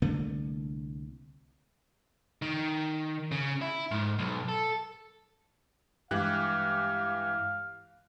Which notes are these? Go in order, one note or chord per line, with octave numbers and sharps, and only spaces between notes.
C2 D3 A3 A#3
D#3
C#3
E4
G#2
B1
A4
G2 E3 G#3 G4 F5 F#6